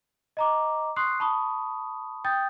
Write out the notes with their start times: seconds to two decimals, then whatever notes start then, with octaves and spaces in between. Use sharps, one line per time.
0.37 D#5 A#5 D6
0.96 C6 C#6 D#6 F#6 C7
1.20 A5 B5 C#6 D#6
2.25 G5 D#6 G6 A6